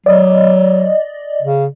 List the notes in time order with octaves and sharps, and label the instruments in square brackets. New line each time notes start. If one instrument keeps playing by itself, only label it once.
[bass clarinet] F#3 [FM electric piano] D5 D#5
[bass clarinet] C#3